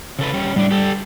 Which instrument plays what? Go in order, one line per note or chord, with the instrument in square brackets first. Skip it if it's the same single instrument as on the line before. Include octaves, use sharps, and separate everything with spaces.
[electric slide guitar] C#3 A4 B4
G3 C#4
[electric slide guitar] A2 D4 [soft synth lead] G3
[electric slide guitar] G4 A4